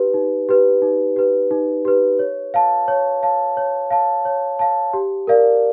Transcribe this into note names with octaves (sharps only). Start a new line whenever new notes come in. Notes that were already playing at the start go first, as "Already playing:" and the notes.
Already playing: D#4 G4 B4
D#4
G4 B4
D#4
G4 B4
D#4
G4 B4
C#5
F5 A5
C#5
F5 A5
C#5
F5 A5
C#5
F5 A5
G4
A#4 D5 F5